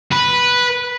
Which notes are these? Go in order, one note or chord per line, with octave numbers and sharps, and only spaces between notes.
B4